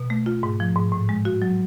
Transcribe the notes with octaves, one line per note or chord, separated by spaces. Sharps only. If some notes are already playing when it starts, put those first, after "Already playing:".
Already playing: B2
A3
F4
G#2
F3
G#2
A2
G#3
F#4
F#3